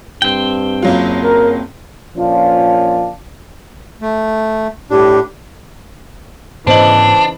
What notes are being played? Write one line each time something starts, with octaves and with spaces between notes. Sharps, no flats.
G2 C4 G5
F#1 F#3 F4
A#4
A#2 F3 C#4 D4 F4
A3
A2 D4 G4
G#2 C#3 E3 B3 D4 C5 D#5 F#7